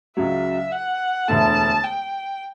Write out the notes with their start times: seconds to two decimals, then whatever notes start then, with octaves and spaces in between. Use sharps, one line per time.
0.17 C#2 C#3 F#3 E5
0.72 F#5
1.28 E1 D2 D3 A3 A5
1.84 G5